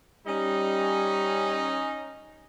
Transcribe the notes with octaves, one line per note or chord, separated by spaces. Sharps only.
G3 C#4 D#4